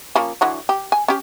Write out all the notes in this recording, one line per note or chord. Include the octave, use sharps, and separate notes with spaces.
F3 A#3 C#4
D3 E3 F#3
G4
G#5
C#4 G4